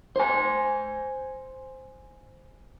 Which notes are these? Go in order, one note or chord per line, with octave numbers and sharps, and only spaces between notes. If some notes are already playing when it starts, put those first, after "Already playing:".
C5 G#5